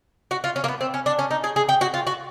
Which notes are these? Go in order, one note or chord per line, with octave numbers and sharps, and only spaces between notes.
F#4
F4
C#4
A#3
B3
C4
C#4
D4
C#4
D#4
G#4
G#4
G4
F#4
F4
F#4